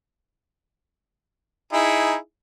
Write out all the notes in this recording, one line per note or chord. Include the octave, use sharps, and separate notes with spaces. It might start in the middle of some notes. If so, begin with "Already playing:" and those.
D#4 E4 G#4